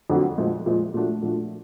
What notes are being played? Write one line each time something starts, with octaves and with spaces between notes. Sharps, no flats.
F2 D3 F#3
A#2 F3 G#3
A#2 F3 G#3
A#2 F3 A3 D4 F#4
A#2 F3 A3 D4 F#4